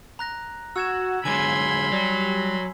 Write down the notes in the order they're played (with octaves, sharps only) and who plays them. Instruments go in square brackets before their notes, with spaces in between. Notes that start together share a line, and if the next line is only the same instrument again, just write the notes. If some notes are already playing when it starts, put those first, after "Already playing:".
[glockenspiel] A#5 F#6 A#6
[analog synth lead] F#4 [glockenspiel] E6 G#6 E7
[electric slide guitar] D3 F#3 G#3 [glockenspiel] G#5 [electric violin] B5 C6 [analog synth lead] G#6
[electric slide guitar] F#3 [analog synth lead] G3